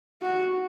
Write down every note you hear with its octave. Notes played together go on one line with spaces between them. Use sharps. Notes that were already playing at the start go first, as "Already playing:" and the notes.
F#4